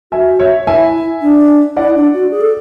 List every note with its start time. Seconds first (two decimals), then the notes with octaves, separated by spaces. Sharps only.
0.12 F#4 E5 G#5
0.39 C#5 E5
0.67 E4 E5 G#5
1.21 D4
1.76 E4 D5 F#5
1.95 D4
2.14 F#4
2.31 G#4
2.41 A4